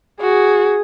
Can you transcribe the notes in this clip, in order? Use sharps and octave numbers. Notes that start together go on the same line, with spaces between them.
F#4 G#4